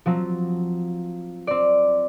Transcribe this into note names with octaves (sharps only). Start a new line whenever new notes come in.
F3 F#3 C4
C4 D5